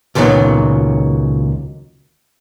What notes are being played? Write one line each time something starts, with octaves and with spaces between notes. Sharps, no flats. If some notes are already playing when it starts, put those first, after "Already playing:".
C#2 A#2 D#3 E3 F#3 B3